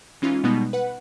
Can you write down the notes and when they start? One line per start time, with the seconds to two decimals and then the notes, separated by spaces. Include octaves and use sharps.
0.22 E3 G#3 C#4 D#4 F4
0.44 B2 G3 G#3 B3 D#4
0.73 B4 F#5